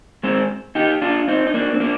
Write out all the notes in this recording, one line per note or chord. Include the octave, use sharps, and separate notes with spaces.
G#3 C4
D#4 G4
D4 F4
C4 D#4
D#4
A#3 D4
C4
A#3 D4